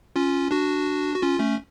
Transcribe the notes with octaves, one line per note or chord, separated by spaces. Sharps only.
C#4 F4
D4 F#4
F#4
C#4 F4
A3 C#4